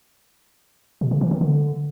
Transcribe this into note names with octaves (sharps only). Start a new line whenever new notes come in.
B2
C#3
E3
D#3
D3